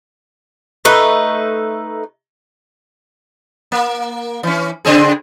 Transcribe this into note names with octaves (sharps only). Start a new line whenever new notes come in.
A3 D#4 B4
A#3
E3 C#4
C#3 C4 G#4